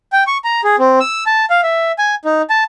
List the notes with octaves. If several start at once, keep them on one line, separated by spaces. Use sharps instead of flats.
G5
C#6
A#5
G#4
C4
E6
A5
F5
E5
G#5
D#4
A5